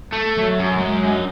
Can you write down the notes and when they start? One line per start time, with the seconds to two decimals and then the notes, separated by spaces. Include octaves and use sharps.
0.13 A3
0.37 F#3
0.59 F#2
0.78 G#3
1.07 D4 D#5